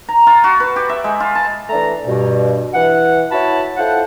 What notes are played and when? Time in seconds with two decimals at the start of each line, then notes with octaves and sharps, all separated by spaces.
0.09 A#5
0.27 F4
0.44 F#4
0.60 B4
0.76 G4
0.89 E5
1.04 G#3
1.20 F4
1.35 A5
1.70 E3 A3 D4 A#5
2.07 G2 B2
2.74 E3 F#5
3.32 E4 F#4 C#5 A5 B5
3.77 E4 F4 A4 C5 F#5